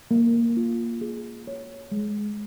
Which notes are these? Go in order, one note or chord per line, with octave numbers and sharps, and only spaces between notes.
A#3
F4
G#4
C#5
G#3